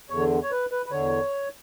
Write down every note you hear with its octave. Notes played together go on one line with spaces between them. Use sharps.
E2 D3 C#5
C#5
B4
B4
B4
E2 D3 C#5